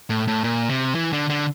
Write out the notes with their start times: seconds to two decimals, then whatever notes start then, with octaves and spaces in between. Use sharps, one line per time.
0.10 A2
0.27 A2
0.44 A#2
0.69 C3
0.95 E3
1.13 D3
1.30 D3